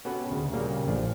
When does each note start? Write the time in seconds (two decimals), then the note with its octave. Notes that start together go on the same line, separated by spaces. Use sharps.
0.05 B3 C#4 F#4 G4 A4 B4
0.30 D2 C#3
0.53 A#2 C#3 G3 A#3 C#4
0.87 A1 F3 D4